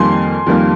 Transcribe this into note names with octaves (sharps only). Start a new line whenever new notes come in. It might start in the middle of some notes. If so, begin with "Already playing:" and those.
Already playing: F2 D#3 G3 A#3 G#5 C6
F2 D#3 G3 A#3